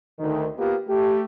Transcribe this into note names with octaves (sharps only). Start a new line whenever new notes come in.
D2 D#3
A#3 B3 F4 G4
A3 G4